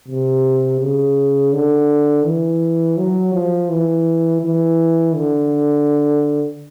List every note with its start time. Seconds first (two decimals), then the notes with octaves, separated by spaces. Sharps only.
0.08 C3
0.80 C#3
1.53 D3
2.25 E3
2.97 F#3
3.33 F3
3.69 E3
4.42 E3
5.15 D3